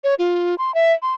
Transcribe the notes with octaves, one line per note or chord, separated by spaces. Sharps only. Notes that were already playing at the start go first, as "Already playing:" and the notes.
C#5
F4
C6
E5
C6